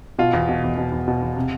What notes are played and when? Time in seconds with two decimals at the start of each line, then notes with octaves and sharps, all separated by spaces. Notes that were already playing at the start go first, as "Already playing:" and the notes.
0.18 B2 F4
0.33 E2
0.49 B2
0.64 E2
0.78 B2
0.92 E2
1.08 B2
1.22 E2
1.36 C3